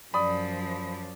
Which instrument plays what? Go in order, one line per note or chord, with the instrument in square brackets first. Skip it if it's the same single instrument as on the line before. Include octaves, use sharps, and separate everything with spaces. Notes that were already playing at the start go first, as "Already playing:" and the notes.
[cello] F#2 F3 [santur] D5 [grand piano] B5 D#6